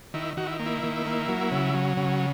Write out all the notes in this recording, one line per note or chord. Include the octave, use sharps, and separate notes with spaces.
D#3 E4
D#3 F#4
E4
A#3
E4
D#3
A#3
F#3
C#3
F#3
C#3